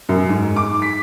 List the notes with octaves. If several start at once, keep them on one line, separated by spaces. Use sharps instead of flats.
F#2
G#2
D6
B6